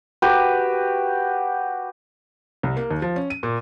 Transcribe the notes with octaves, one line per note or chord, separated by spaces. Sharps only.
F#4 G4 B4
C2
A#3
D#2
F3
C#4
D#7
A#2